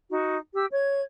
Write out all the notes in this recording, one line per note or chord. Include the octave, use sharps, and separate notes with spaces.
D#4 F#4
G4 E6
C#5 G#6